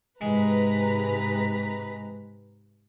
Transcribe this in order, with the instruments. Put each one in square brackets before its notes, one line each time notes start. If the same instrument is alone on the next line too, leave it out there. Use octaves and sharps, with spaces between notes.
[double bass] G#2 C3 [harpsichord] G#3 [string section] B4 A#5 B6